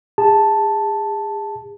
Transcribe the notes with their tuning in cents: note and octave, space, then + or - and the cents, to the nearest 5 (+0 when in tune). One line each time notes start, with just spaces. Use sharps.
G#4 -35 A5 +0